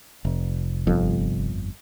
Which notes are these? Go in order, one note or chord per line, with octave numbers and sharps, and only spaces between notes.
F1
G1 F2